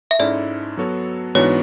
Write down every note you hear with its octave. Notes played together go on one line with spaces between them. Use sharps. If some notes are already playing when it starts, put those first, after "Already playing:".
E5
G#2 G#3 C#4 E4 A4 D5
F#3 B3 F#4 A4 C#5
G#2 E3 B3 D4 F#4 C#5